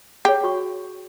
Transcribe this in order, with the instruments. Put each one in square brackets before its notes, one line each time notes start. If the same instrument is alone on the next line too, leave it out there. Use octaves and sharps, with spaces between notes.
[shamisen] G4 [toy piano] G#4 C#5
[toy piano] F#4 C#6